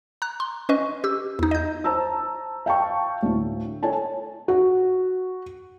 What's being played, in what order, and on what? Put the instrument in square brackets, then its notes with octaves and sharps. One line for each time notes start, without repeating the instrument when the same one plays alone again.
[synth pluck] A#5 F#6
C6
C#4 B4 D#5 C#6
G4 E6
E2 D#4
D#5 G6
[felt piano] C5 A5 A#5 E6
F5 G5 A5 C#6
D2 A2
A4 C#5 G#5 A5
F#4